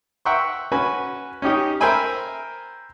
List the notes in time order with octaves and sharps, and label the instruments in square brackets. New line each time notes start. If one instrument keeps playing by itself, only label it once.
[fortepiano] E5 F#5 G5 A#5 C6 C#6
C#4 F#4 B4 G#5 B5
C#4 D#4 G4 D#5
A#4 C5 E5 G5 G#5 B5